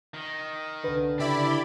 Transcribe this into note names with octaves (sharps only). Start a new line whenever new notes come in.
D#3
C2 D3 B4
C#3 E4 G4 D5 B5